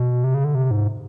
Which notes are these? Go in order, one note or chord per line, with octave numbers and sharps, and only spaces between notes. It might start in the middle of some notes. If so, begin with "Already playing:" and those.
Already playing: B2
C3
C#3
D3
C3
G#2